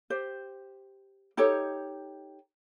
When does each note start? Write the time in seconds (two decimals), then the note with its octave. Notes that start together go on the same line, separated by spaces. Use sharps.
0.10 G4 C5
1.37 D#4 G4 A4 C#5